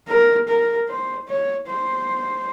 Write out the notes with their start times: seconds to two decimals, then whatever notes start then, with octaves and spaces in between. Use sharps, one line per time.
0.09 A#4
0.48 A#4
0.89 C5
1.28 C#5
1.67 C5